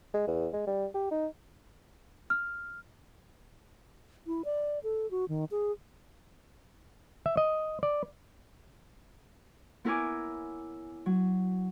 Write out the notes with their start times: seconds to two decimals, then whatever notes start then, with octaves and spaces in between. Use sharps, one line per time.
0.14 G#3
0.27 E2
0.53 G#3
0.67 G3
0.94 G4
1.11 D#4
2.30 F6
4.27 E4
4.45 D5
4.83 A4
5.11 F#4
5.29 D#3
5.51 G#4
7.26 E5
7.37 D#5
7.83 D5
9.85 B3 E4 A#4 C#5 G#5 D6
11.06 F#3